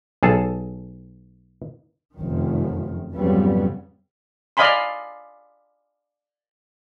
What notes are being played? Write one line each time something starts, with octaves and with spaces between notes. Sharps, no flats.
B1 G#4 A4 A5
F1 F#2 D#3
F2 G#2 C#3 F#3 G3 B3
D5 D#5 F5 G#5 B5 C6